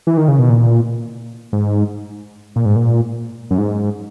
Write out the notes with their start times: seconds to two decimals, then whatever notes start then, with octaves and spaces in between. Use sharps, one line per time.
0.07 E3
0.17 D#3
0.28 C#3
0.39 B2
0.50 A#2
1.53 G#2
2.56 A#2
2.65 G#2
2.76 A#2
3.51 F#2
3.58 G#2